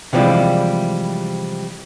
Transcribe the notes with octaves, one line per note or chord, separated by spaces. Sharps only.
C3 E3 F3 G3 G#3 E4